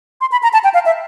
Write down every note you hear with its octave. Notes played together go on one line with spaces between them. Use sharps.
C6
B5
A#5
A5
G5
F5
E5